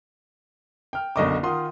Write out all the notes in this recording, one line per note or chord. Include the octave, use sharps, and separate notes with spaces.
G5 F6
F#1 B1 D3 D#5 C#6 D6
D#3 F4 F#5 C6 D#6